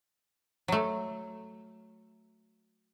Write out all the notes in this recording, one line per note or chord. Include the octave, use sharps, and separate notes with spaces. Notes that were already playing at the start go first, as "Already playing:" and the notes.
F#3 A3